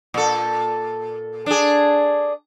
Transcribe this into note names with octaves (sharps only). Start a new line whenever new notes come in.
A#2 A4
D4 G#4